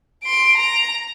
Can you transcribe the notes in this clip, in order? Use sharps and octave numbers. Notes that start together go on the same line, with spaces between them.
C6 D7
A#5